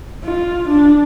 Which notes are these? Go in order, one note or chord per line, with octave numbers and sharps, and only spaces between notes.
F4
D4